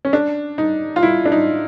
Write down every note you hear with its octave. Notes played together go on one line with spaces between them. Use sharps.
C#4
D4
D#4
F4
E4
D4
D#4